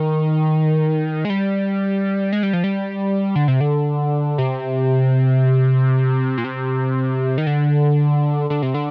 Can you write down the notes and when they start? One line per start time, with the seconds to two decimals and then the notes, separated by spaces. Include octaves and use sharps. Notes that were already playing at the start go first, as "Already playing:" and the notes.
Already playing: D#3
1.25 G#3
1.30 G3
2.33 G#3
2.43 G3
2.53 F3
2.64 G3
3.35 D3
3.48 C3
3.61 D3
4.38 C3
6.38 A#2
6.44 C3
7.38 D#3
7.47 D3
8.50 D3
8.62 C3
8.74 D3